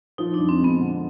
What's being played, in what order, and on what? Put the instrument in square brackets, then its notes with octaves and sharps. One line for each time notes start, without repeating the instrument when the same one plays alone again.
[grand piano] F3 [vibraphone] D#4
[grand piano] F2 [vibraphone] D4
[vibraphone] C4
[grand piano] G#3 [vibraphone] B3
[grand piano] D3